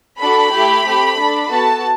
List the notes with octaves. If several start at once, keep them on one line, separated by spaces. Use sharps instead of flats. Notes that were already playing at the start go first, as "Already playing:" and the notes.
D4 F#4 A4 B5
A3 E4 G4
A3 C4 G4
D4 A4
B3 F#4 A4 A5